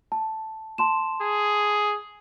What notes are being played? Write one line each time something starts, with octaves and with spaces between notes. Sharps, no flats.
A5
A5 C6 E7
G#4